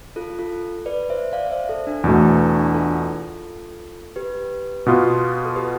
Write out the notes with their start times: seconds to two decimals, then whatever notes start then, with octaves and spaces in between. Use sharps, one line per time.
0.16 F4 A4
0.39 F4 A4
0.86 B4 D5
1.10 C5 E5
1.33 D5 F5
1.46 D5
1.51 C5 E5
1.68 A4 C5
1.87 D4
2.04 E2 B2 A3 D4
2.22 E4
2.39 D4
2.57 D4
2.74 F4 A4
4.16 G4 B4
4.86 B2 B3 F4
5.45 A4
5.56 G4 B4